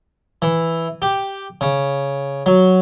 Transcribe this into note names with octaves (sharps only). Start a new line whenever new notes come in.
E3
G4
C#3
F#3